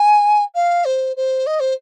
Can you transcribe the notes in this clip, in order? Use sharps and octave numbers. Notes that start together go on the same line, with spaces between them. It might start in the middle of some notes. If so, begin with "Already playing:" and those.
Already playing: G#5
F5
C5
C5
D#5
C5